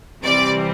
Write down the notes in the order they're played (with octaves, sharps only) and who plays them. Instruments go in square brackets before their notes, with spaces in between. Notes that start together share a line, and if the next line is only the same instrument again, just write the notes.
[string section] C3 E3 G3 C4 D5